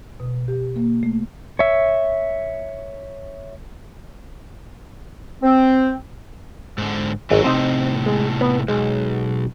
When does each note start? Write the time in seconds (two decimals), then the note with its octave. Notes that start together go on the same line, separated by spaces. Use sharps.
0.20 B2
0.48 G4
0.76 A#3
1.03 A3
1.59 C#5 E5
5.43 C4
6.78 G#2 D3
7.30 G#1 E3 F#3 D#5
7.44 A2 C3 C4 D#4
8.06 G#3
8.41 B3
8.68 B1 G#3